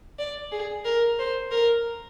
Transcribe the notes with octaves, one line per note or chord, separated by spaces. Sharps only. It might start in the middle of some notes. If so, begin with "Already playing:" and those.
D5
G#4
A#4
C5
A#4